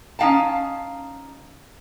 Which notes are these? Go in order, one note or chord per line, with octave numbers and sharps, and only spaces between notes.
C#4 D#4 G4 F5 G5 A5